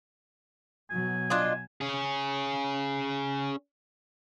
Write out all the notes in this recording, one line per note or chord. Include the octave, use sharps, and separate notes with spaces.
B2 F#3 G#5
D4 F4 D#5
C#4 G#4